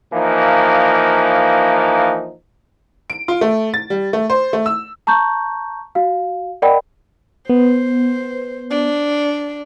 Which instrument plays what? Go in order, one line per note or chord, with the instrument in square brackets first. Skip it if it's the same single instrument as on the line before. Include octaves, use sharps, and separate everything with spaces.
[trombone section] E3 F3 A#3 D#4
[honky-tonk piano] D7
F4
A3
A6
G3
A3
C5
A3
E6
[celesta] A5 A#5 C#6 G6
F#4 F5
A#4 D5 D#5 F#5 G5 B5
[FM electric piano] B3 [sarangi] C5
[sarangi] D4